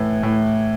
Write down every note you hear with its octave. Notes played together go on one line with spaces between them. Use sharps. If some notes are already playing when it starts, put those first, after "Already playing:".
Already playing: A2 E3
A2